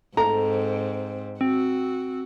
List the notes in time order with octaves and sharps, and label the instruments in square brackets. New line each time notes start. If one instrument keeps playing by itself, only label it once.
[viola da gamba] G#2 C4 [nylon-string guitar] A4 [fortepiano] A#5
[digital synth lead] C4 [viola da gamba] F#4